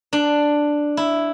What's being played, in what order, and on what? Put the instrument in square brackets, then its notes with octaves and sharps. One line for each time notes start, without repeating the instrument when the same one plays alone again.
[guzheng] D4
E4